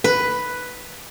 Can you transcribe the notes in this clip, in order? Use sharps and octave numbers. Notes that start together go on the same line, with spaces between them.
B4